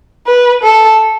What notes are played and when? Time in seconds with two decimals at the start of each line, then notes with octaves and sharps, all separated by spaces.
0.27 B4
0.63 A4